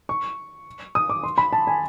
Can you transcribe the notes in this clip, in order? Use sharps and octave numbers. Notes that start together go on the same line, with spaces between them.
C#6
D#6
D6
C6
B5
A5
G#5